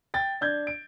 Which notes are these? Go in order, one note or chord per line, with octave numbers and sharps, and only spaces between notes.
G5 A6
D4 G6 G#6
D7